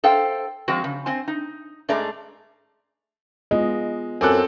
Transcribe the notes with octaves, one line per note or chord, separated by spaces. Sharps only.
A4 C5 F5 G5
F3 G#3 C4 F#4
C#3
C4 C5 G#5
D#4
G#2 A3 G#4 D5 A#5
G#3 B3 F4 D#5
F#2 C4 A4 G#5 D6 F#6